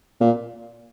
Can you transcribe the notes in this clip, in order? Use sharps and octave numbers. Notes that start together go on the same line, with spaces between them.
A#2